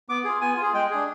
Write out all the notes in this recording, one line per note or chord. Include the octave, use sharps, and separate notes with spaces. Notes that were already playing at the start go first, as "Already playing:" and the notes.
B3 D6
F4 G#4
B3 G#5
F4 G#4
G#3 G5
D4 G#4